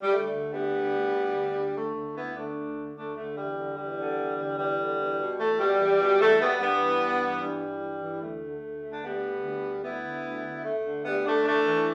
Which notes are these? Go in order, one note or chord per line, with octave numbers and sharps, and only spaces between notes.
G3
D2 A3
D3
D2 G3 B3
D3
D2
D3
D2
D3
D2 A3
D3
D2 B3 E4
D3 A3 D4
D2
D3
D2 A3 D4
D3 A3
E2 G3
D3
E2 G3
D3
E2
D3
E2 G3
D3
E2
B2
E2 A3
B2 G3
E2
B2
E2 A3
B2 G3 B3
G2 G3 B3
E3
G2
E3
G2 G3
E3
G2
E3
D2 A3
D3
D2
D3
D4
D2 G3 B3
D3
D2
D3
D2 B3 E4
D3
D2
D3
D2 A3
D3
D2 G3 B3
D3 A3 D4
E2 A3 D4
E3